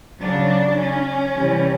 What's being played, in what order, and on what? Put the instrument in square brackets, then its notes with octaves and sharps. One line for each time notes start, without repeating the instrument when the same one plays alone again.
[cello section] C#3 F#3 D4
C#4
C3 E3 G3